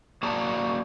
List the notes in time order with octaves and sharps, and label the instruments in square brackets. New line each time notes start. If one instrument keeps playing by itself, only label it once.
[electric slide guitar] A#3 F#4 G#4 D5 A5 A#5